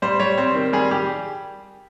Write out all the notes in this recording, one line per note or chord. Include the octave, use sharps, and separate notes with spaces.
G3 C5
G3 C#5
C4 C5
D#3
G3 G#4
G3 G4